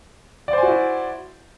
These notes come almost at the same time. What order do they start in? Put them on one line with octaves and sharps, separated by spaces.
D5 C5 G#5 F#4 E4